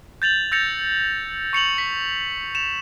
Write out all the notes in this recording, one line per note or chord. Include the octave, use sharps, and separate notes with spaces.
G6 A6 F7 F#7
E6 G6 A6 A#6 C#7 F7
C#6 C#7 F7 F#7
B6
E7 F7